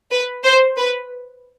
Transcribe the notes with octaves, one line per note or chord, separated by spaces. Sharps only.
B4
C5
B4